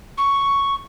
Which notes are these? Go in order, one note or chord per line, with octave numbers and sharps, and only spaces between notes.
C#6